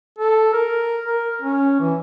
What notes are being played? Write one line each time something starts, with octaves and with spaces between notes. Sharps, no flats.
A4
A#4
A#4
C#4
E3